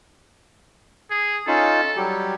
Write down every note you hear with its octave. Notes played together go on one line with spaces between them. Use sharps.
G#4
C#4 D#4 F4 A4
F#3 G3 G4